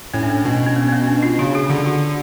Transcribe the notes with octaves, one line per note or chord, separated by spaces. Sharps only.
A2 C#4
D4
C#4
B2
C#4
B3
C#4
B3
D4
F4
C#3 F#4
G#4
D3 G#4
F#4